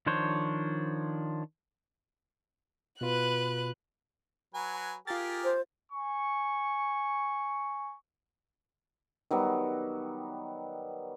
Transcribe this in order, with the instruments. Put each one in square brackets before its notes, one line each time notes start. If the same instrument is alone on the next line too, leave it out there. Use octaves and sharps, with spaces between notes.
[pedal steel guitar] D#3 F3 D4 C5 C#5
[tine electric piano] B2 F4 [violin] B4 F#6
[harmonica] F#3 B4 G#5
[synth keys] F4 A6 [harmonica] G4 G#4 A#4
[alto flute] C5
[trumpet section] G#5 C#6
[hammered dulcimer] D#3 F#3 G3 B3